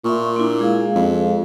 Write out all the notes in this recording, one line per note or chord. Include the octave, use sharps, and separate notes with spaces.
A#2 E5 C6 C#6
A#3 D4 E4
G#3 G#4 F5
F2